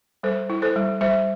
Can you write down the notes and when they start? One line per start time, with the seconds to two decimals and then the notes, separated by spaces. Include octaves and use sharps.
0.23 G3 A4 C5
0.50 E4
0.62 A4 C5
0.76 G3
1.01 G3 C5 E5